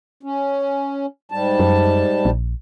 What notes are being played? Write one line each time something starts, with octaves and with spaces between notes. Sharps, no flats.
C#4
G#2 G3 A5
F#2
A#1